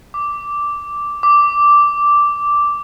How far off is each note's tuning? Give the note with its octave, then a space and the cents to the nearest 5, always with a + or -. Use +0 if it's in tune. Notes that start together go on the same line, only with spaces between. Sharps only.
D6 -5
D6 -5